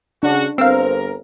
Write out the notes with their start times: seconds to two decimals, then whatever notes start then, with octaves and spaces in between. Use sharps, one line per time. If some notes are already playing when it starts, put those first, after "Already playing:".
0.23 C#3 D4 F#4
0.58 G1 C4 A#4 C5 F5 E6